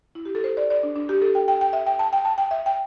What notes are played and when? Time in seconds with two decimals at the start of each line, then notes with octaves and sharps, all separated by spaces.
0.15 E4
0.25 G4
0.35 A4
0.44 C5
0.57 D5
0.70 D5
0.83 D4
0.96 D4
1.09 G4
1.22 A4
1.35 G5
1.48 G5
1.61 G5
1.73 E5
1.87 G5
1.99 A5
2.13 G5
2.25 A5
2.38 G5
2.51 E5
2.66 G5